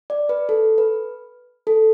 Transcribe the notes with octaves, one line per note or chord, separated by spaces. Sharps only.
D5
B4
A4
B4
A4